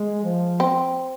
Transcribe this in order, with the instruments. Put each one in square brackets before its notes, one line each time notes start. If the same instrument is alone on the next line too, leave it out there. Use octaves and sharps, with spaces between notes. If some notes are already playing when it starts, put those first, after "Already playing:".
Already playing: [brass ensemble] G#3
F3
[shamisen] C4